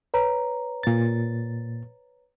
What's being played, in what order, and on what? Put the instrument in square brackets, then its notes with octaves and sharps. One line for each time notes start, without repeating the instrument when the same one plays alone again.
[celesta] B4 C#5 A#5
[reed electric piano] A#2 A6